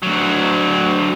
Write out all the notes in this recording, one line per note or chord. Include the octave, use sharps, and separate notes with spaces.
D2 F#3